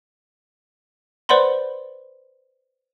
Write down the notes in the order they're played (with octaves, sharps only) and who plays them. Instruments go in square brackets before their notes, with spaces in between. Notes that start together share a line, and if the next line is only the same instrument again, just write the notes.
[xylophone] B4 C5 D5 F#5 B5 C6